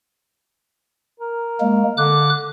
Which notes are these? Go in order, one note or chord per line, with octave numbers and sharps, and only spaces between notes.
A#4
G#3 A#3
D3 D6 F#6